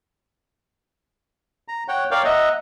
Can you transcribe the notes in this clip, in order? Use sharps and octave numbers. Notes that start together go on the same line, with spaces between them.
A#5
C#5 F#5 G5
A#4 C#5 D5 F5 G5
D#5 E5 F#5 A#5